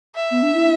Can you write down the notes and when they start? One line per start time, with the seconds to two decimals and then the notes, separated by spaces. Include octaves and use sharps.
0.16 E5
0.31 B3
0.43 D4
0.54 E4